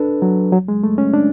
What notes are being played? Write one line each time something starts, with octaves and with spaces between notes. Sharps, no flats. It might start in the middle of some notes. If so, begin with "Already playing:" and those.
Already playing: D4 A4 B4
F#3
F#3
G#3
A3
C#4
D4